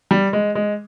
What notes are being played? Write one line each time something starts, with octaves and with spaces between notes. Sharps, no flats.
G3
G#3
G#3